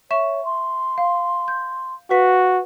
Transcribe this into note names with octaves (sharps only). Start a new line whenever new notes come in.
C#5 E5 C#6 E7
C6
F5
G6
F#4 B4 F5 B6